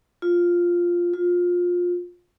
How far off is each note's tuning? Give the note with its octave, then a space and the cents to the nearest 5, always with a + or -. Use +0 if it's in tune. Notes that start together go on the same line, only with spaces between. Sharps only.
F4 +0
F4 +20